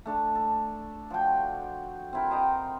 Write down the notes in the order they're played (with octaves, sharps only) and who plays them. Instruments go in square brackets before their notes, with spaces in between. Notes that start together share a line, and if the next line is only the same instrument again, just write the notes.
[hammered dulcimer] A3 D4 A4
A4
F3 F#4 G5
C4 E4 A#4
C5 D#5 G5 A#5